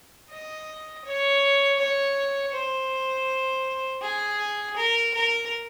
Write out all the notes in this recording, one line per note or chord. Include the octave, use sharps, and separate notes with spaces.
D#5
C#5
C#5
C5
G#4
A#4
A#4